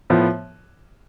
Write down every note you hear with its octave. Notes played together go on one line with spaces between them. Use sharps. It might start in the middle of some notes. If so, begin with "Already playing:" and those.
A2 F3 B3